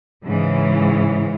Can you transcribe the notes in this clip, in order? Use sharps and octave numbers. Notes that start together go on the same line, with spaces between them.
G#2 C#3 E3